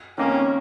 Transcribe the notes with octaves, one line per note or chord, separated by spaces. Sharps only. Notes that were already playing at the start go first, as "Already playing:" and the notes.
F2 D#3 A#3 C#4